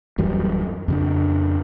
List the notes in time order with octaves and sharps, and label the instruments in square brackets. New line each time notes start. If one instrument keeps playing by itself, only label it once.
[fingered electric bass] D1 F#2 E3 G3
F2 C#3 D4